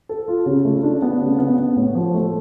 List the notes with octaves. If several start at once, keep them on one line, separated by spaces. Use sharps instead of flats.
A4
F4
C#3
A3
D4
B3
C#3
B3
B3
A2
F3
A3